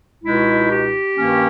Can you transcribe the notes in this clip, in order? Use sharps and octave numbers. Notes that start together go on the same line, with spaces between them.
C#2 B2 G#3 D#4 E4
G4
G2 D#3 A#3 C#4